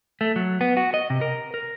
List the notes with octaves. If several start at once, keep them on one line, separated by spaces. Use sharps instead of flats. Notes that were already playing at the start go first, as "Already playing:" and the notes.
A3
F#3
B3
F#4
D#5
C3
A#4
A#4